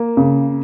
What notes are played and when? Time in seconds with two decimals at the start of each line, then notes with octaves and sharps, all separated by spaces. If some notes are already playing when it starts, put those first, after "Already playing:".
Already playing: A#3
0.17 C#3